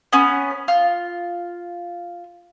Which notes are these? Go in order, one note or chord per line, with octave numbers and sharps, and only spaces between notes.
B3 C#4
F4